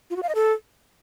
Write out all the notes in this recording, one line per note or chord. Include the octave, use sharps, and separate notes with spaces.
F4
F#4
F5
D#5
A4